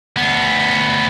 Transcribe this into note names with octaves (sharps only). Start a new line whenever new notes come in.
D2 B3